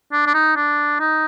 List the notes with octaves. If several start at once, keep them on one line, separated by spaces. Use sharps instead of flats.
D4
D4
D#4
D4
D#4